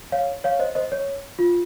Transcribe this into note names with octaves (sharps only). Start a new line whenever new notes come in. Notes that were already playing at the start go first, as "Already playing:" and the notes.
C#5 F5
C#5 F5
C5 D#5
C5 D#5
C#5
F4